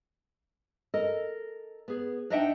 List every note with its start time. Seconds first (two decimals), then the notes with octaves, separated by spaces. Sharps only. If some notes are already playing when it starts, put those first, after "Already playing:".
0.94 A4 A#4 D#5
1.88 B3 G#4
2.30 D4 D#4 D#5 E5 F#5 G5